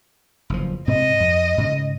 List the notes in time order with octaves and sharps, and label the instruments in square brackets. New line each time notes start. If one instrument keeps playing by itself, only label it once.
[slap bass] F#1 E2 F3
[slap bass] G#2 C3 C4 [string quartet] D#5
[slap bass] F2
G#2 C#3